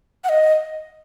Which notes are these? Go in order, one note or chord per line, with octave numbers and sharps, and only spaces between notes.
F#5
D#5